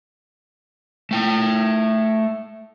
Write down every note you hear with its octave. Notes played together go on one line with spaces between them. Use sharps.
A3 G5